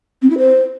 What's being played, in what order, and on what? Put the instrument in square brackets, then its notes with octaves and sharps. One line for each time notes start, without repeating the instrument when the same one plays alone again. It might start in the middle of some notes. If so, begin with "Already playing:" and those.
[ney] C4
E4
C5